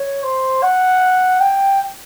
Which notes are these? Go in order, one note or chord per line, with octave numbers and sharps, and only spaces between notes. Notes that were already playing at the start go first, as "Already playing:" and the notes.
Already playing: C#5
C5
F#5
G5